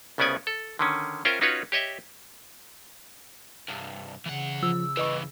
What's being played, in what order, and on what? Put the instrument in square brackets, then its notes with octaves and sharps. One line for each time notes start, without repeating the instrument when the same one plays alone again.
[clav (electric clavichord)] C2 C#3 B3 C#4 D5 G#5
A4
D3 D#3 C#4
C#4 F4 A#4 C5 E5 G5
C#4 D#4 F4 F#4 B4 C#5
G4 C#5 D#5 E5
[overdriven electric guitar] C2 G2
[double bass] C#3 [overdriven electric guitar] E3 F#5
[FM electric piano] F3 [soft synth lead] E6
[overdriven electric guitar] G2 E3 [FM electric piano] B4 D#5 C#6